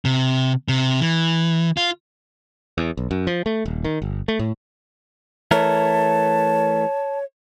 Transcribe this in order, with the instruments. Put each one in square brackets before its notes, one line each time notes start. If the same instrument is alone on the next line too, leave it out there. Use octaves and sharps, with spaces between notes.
[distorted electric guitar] C3
C3
E3
F4
[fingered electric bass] E2
B1
F#2
F3
A3
D#1
D#3
G1
A3
A2
[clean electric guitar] E3 A3 A#4 [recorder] C#5 [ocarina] A5